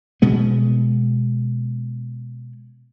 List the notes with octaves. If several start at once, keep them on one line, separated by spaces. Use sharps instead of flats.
B2 G#3 B3